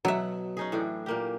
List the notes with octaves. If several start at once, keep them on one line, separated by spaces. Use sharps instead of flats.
B2 F#3 E5 F#5
C#4 D#4 G#4
A2 E3 D4
A#2 A#3 G4